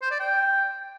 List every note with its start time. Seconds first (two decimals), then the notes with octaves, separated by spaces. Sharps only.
0.02 C5
0.11 D5
0.20 G5